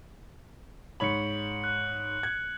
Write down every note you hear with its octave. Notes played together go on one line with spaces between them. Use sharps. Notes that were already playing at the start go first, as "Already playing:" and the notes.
G#2 C#5 B5 C#7 F#7
F#6
G#6